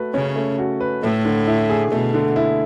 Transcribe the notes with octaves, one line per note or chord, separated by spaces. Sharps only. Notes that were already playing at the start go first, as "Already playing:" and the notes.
Already playing: A3 F#4 B4
C#3 C#4
A3
F#4
B4
A2 A3
D3
E4
G#4
B2 A3
D3
E4